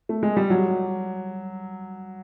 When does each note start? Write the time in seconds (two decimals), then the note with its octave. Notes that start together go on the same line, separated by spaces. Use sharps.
0.09 A3
0.23 G#3
0.37 G3
0.50 F#3